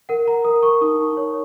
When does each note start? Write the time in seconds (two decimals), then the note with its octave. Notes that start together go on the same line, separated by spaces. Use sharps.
0.09 A#4 F#5
0.27 A#4 A#5
0.44 A#4 D#6
0.63 A#4 C#6
0.81 D#4 D#6
0.99 D#4
1.17 C#5